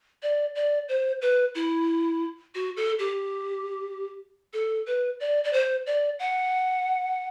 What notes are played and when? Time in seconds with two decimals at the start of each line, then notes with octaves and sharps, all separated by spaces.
0.23 D5
0.55 D5
0.89 C5
1.22 B4
1.55 E4
2.55 F#4
2.77 A4
2.99 G4
4.53 A4
4.87 B4
5.20 D5
5.44 D5
5.53 C5
5.86 D5
6.19 F#5